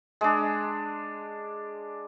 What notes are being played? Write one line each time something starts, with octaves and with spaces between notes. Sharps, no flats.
G#3 D4